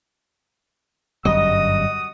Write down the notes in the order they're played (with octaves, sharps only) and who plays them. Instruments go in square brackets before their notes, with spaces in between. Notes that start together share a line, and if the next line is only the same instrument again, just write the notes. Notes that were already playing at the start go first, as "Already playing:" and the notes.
[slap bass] G1 F#2 G3 [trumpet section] F#4 D#6 [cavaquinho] D#5